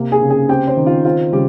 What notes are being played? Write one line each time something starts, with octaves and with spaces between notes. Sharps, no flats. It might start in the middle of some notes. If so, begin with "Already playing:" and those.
Already playing: C3 A#3
G#4 G#5
C#3
G#4 G#5
C4 G4 G5
C4 C5
D#3
F4
C4 F4
C#3 G3 G4